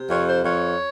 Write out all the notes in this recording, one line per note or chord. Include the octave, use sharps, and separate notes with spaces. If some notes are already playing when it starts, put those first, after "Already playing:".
Already playing: C3
F2 C#5
C5
F2 C#5